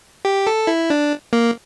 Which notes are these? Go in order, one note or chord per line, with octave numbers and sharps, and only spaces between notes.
G4
A4
E4
D4
A#3